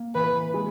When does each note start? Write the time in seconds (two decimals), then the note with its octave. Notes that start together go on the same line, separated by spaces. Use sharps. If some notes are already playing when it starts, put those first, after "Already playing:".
Already playing: A#3
0.15 E3 B4
0.54 G#3